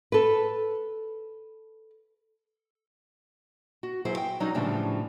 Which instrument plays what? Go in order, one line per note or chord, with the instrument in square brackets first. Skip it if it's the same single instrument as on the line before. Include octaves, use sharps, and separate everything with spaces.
[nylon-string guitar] A4 B4
F#4
F#3 E4 G#4 C5
G5
F#3 G3 C#4 D#4 F#4
A2 C#3 E3 F3 G3 D4